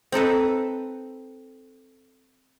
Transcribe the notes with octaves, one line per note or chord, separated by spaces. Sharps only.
C4 D#4 A4 B4